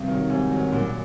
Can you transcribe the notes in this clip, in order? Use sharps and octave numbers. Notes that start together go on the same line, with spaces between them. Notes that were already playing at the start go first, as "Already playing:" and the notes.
Already playing: G2 C3
D#3 F#3
G#2 C3
D#3 F#3
F#2 A#2